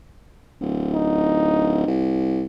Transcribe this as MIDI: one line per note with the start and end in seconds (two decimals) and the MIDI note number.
0.61 1.84 26
0.93 1.90 63
1.87 2.46 36